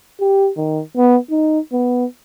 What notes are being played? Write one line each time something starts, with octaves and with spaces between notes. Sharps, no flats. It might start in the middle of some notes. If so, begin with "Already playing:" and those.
G4
D#3
B3
D#4
B3